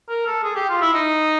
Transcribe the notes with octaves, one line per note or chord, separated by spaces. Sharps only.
A#4
A4
G#4
G4
F4
E4
D#4